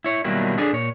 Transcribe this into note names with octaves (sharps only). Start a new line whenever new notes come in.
E4 C#5
B2 D#3 F#3 G3 A#3 E4
D4 G#4 A4
A#2 C#5